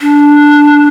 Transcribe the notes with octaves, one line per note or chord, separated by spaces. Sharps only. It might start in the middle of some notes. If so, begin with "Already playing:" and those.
D4